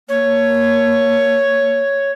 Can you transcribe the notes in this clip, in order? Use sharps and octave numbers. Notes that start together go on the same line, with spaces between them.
A#3 C#5